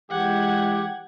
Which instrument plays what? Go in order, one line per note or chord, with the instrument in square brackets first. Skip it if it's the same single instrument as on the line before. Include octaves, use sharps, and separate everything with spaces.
[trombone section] E3 G#3 [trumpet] G4 [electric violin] F#5 G#6